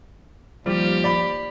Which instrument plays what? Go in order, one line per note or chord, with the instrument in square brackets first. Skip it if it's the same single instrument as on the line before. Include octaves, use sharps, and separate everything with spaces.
[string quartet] D#2 G4 [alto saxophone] F3 [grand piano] G3
[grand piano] D5 B5